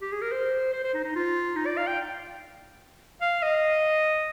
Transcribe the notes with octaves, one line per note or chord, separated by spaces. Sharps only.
G4
G#4
A#4
C5
C5
C5
D#4
D#4
F4
D#4
D5
F5
G5
F5
D#5